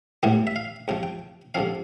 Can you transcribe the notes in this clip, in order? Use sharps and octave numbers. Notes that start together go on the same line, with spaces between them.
A1 A2 E3 G3 B3 G5
E5
F5
C2 C3 F3 G5
G5
G2 D3 F3 C4 F5